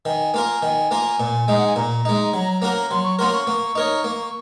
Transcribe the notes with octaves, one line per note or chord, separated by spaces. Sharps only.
D#3 G#5
A#3 F4 A#4
D#3
A#3 F4 A#4
A#2
G#3 D#4
F#5
G#5
A#2 A#5
G#3 D#4
F#3
A#3 C#4 F#4 A#4
F#3 C6
C#6
A#3 C#4 F#4 A#4 C6
C#6
A#3
D#4 A#4 C#5
A#3